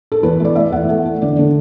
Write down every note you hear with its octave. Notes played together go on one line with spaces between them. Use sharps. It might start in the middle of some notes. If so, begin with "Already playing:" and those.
A4
E2 B4
A3 D5
A3 E5
E2 F#5
A3
A3
D3 D5
D3